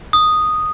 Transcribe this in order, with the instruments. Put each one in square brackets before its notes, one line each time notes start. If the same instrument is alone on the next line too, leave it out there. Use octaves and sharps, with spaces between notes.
[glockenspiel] D#6